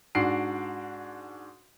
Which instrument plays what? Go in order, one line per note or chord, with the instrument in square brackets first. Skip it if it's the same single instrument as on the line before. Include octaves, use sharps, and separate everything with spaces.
[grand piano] G#2 D4 F#4 C7 D7